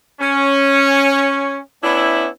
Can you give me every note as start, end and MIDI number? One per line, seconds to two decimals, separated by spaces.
0.21 1.59 61
1.84 2.27 59
1.84 2.27 61
1.84 2.27 62
1.84 2.27 64